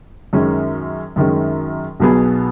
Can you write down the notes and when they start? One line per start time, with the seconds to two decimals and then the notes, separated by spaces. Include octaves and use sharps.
0.33 F#2 D#3 G#3 C#4
1.16 F#2 D#3 G#3 C#4
2.00 B1 B2 F#3 B3 G#4